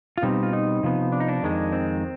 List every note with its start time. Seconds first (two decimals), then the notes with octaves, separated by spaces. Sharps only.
0.18 F4
0.22 B2 G3 C4 D#4
0.43 F4
0.53 D#4
0.83 C3 F3 B3
1.12 D4
1.20 D#4
1.28 D4
1.43 F2 D#3 G#3
1.72 C4